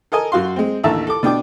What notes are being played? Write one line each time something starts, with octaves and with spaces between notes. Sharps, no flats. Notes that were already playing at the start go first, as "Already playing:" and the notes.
A4 A#4 D#5 G#5
F#2 F#4 F5 C6
G#3 C4
A1 D#2 D3 E5 A5 A#5
A4 D6
B2 D4 G5 D6